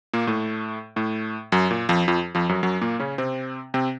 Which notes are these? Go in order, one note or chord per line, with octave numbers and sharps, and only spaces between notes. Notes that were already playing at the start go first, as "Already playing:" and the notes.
A#2 A#3
A2 A3
A2 A3
F#2 F#3
A#2
F2 F3
F2 F3
F2 F3
F#2 F#3
F#2 F#3
A#2 A#3
C#3 C#4
C3 C4
C3 C4